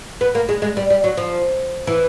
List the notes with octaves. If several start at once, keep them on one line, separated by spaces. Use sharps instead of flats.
B3
A#3
G#3
G#3
G3
G3
F#3
F3
E3